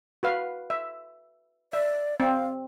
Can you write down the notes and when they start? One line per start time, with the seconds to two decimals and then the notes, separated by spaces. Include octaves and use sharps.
0.23 F#4 B4 F5
0.70 E5
1.73 D5 E5
2.20 C4 F5